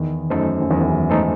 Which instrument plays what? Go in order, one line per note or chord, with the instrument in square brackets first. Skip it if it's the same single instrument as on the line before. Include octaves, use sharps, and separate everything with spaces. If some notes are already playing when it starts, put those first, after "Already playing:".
Already playing: [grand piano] E2 [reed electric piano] D#3
[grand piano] F#2 [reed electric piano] A3 D#4 A4 C5
[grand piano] F#2
[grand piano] E2 [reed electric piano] D#3
[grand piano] E2
F#2
[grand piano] G#2 [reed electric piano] A3 D#4 A4 C5